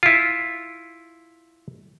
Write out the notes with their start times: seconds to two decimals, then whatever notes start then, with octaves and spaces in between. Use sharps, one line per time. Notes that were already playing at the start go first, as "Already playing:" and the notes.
0.03 E4 F4